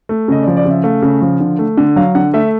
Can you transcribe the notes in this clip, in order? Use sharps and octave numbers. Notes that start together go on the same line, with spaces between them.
A3
C#3 D#5
D5
F3
D5
C#3 E5
A3 F5
C#3
F3
D3
A3
D3
F#3 F5
D3 F#5
A3 E5